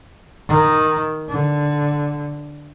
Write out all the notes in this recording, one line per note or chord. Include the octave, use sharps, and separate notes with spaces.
D#3
D3